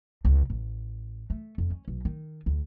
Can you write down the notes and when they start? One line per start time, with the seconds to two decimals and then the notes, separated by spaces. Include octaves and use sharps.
0.25 C#2
0.50 A1
1.30 A3
1.58 F2
1.70 C#4
1.88 B1
2.05 D#3
2.46 D2